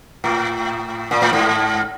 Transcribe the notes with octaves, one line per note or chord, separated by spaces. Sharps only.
A2
A#2
A2
G#2